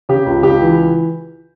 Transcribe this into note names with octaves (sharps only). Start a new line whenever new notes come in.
C#3 G4
C#2
C#2 G4
E3